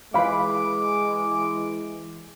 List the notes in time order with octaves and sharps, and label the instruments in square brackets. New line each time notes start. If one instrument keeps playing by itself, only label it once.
[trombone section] E3 G#3 [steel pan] F5 B5 [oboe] D6